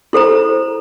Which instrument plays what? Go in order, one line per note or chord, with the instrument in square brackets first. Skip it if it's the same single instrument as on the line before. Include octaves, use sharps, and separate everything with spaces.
[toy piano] E4 A4 C5 A#5